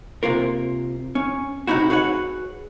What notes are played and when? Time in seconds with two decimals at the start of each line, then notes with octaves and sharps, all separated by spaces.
0.23 C3 A#3 F4 A#4
1.15 C#4
1.67 A2 C3 D#4 E4 F#4
1.90 F#4 G#4 B4 C#5 D#5 F#5